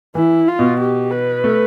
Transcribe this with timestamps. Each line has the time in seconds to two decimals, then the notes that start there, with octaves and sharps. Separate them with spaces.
0.15 E3 E4
0.48 F4
0.59 B2
0.80 G4
1.11 B4
1.44 A3